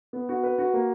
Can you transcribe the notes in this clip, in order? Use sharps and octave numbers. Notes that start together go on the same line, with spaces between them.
B3
F#4
B4
F#4
A#3